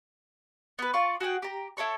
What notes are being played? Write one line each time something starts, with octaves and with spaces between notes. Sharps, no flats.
B3 B4
F4 D5 C#6
F#4 G#4 F#5 G5
G4 A#5
E4 A4 C#5 C#6